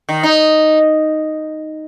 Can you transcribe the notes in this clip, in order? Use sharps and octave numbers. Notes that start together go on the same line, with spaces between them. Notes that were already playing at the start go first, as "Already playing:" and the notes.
D#3
D#4